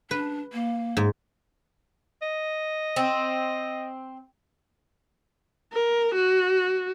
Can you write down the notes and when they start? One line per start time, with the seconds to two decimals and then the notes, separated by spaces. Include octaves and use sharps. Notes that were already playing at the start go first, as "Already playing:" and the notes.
0.11 D4 B4
0.53 A#3
0.97 G#2
2.22 D#5
2.96 C4
5.73 A#4
6.15 F#4